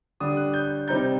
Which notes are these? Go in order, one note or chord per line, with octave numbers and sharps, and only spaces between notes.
D3 G3 D4 D#6
F#6
G6
C3 G3 C4 D#4 G6